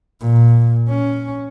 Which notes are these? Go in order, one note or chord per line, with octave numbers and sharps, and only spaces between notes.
A#2
C#4